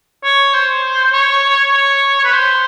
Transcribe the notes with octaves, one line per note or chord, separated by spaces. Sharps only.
C#5
C5
C#5
C#5
B4
C5